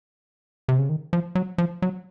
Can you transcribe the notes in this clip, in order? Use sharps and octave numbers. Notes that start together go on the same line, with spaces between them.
C3
C#3
D#3
F3
F#3
F3
F#3